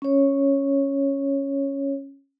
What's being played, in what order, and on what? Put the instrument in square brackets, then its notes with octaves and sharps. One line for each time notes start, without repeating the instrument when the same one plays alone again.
[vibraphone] C#4 C#5